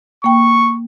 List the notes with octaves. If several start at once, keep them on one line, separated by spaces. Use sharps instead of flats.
A#3 G5 C#6